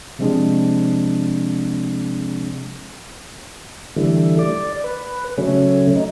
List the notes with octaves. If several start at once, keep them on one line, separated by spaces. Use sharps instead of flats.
C3 F3 G#3 C4 D4 G#4
D3 E3 G3 A3
D5
B4
C#3 F#3 A3 C#4
D#4